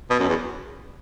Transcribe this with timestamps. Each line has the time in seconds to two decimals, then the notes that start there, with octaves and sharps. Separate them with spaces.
0.10 B2
0.19 F#2
0.29 E2